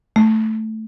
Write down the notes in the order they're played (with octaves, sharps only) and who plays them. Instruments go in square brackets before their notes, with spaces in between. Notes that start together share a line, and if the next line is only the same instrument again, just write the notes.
[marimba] A3